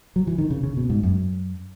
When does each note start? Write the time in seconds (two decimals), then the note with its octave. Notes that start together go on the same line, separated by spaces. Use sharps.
0.16 F#3
0.27 E3
0.38 D#3
0.50 C#3
0.63 C#3
0.77 B2
0.90 G#2
1.03 F#2